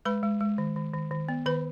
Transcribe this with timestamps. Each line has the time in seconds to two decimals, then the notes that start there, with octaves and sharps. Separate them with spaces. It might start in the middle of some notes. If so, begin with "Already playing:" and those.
0.05 G#3 B4 B5
0.23 G#3
0.40 G#3
0.58 D#3
0.76 D#3
0.94 D#3
1.11 D#3
1.29 B3
1.46 D#3 B4 B5